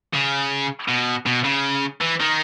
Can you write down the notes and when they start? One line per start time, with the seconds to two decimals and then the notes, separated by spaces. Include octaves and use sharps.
0.14 C#3
0.88 B2
1.26 B2
1.45 C#3
2.01 E3
2.20 D#3